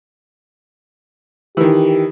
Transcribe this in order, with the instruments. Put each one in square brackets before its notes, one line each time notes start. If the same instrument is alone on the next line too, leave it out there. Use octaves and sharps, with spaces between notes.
[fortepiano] D#3 E3 [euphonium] G4